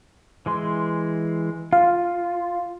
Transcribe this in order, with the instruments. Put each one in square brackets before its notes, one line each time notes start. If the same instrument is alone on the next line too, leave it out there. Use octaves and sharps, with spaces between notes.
[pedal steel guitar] E3 G#3 C6
[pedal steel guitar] F4 [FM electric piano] F5